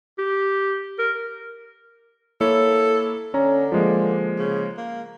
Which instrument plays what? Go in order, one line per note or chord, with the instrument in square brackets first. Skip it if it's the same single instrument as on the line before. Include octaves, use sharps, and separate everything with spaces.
[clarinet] G4
A#4
[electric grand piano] A#3 E4 C#5 [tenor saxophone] A4
[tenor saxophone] D3 [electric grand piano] C#4 C#5 A#5
[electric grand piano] F3 G#3 A#3
[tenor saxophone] C#3
A#3